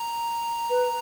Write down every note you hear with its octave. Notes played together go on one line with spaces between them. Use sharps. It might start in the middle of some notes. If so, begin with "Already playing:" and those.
Already playing: A#5
B4